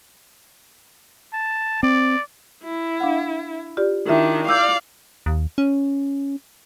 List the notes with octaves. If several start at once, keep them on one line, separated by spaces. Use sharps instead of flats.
A5
C4 D5
E4
D4 F5 F#5
F4 G4 D5
D#3 D4 E4 F4 E5
D5 F5 D6 E6 G6
D#2
C#4